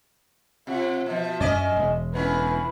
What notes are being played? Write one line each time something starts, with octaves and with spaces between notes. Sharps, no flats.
C3 F4 F#5
B2 F3 E5
F#2 C#4 D5 D#5
E1 G#3
D3 B3 C#4 E4 B4